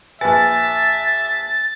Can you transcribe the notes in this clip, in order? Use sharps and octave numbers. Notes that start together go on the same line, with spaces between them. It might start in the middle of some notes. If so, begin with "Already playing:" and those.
A#1 B4 E5 G#5 A6